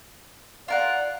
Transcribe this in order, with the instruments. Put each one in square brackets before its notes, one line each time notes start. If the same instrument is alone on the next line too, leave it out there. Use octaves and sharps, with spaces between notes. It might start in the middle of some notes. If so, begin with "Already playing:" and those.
[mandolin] F4 A#4 F#5 [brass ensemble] D5